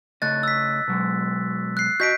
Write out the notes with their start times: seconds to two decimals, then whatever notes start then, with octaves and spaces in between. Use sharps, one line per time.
0.22 C#3 A3 D#5 F#6 A6
0.43 E6 B6
0.88 B2 F#3 G#3
1.77 F#6 C7
2.00 F#4 D#5 G6 B6 D7